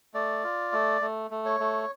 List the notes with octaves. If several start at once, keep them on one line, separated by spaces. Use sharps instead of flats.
A3 D5
F4
A3
A3
A3
C#5
A3